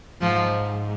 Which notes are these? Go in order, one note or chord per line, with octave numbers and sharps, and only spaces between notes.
G#2 F3